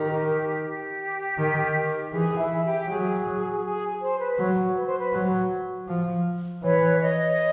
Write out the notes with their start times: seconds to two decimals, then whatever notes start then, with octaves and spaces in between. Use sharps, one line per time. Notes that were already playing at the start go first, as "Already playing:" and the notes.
Already playing: D#3 G4
0.63 G4
1.38 D#3
2.13 E3 G#4
2.38 E4
2.63 G4
2.88 F#3 G#4
3.63 G#4
4.01 C5
4.19 B4
4.38 F#3
4.76 B4
4.87 C5
4.97 B4
5.13 F#3
5.88 F3
6.62 E3 B4 C#5
7.00 C#5 D#5